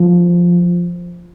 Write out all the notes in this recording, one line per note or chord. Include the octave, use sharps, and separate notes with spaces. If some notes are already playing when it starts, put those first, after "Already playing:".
Already playing: F3